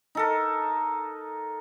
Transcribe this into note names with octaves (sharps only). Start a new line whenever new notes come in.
D#4 A4 A#4